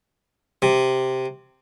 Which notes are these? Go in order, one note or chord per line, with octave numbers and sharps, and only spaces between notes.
C3